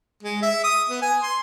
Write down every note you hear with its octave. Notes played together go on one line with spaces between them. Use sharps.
G#3
E5
D#6
B3
G#5
C6